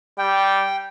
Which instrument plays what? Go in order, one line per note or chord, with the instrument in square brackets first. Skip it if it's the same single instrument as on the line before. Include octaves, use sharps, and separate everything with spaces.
[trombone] G3 [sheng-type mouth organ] G5